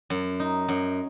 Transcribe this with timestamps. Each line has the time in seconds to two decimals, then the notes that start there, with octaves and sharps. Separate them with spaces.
0.10 F#2
0.40 D#4
0.68 F#2